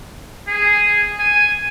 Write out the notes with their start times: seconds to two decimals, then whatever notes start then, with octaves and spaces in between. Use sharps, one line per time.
0.47 G#4
1.19 G#5